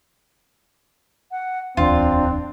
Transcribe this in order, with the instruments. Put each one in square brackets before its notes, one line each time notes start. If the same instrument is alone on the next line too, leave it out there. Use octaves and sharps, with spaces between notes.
[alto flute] F#5
[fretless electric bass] D1 G1 E2 [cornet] C4 [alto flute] D4 [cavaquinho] F4